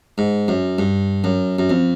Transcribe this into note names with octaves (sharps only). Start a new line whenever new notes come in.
G#2
F#2
G2
F#2
F#2
F2